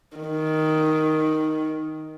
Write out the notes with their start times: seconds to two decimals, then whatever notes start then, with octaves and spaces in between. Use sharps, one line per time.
0.17 D#3